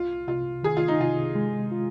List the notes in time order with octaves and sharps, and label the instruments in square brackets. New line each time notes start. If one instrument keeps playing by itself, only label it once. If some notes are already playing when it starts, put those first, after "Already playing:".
Already playing: [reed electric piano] C2 [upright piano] F4
[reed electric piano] C3 [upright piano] F4
[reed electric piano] D#3 [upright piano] G#4
[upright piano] F4
D#4
[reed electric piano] C3 [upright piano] F4
[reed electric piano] G#3
F4